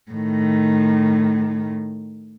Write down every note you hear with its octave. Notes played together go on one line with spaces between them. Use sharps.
A2 D#3